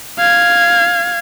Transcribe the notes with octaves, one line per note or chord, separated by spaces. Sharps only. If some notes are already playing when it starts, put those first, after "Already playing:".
F5 G#6